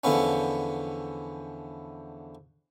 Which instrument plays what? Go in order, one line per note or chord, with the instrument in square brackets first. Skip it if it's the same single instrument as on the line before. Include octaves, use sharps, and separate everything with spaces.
[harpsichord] E2 D3 F3 B3 C#4